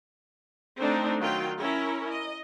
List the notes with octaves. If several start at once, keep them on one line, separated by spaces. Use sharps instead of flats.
A3 C4 D4 D#4
D#3 F#3 F4 G5
C#4 E4 A#4 C#5
D#5